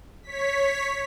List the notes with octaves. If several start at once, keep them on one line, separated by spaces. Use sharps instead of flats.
C#5 B6